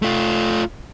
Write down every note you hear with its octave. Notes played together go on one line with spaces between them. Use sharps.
A3 F4